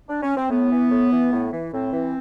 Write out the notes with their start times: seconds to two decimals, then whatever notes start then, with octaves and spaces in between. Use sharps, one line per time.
0.08 D4
0.22 C#4
0.36 C4
0.50 A2 B3
0.71 E3
0.90 A2
1.12 E3
1.32 A2
1.52 E3
1.73 A2 C4
1.93 E3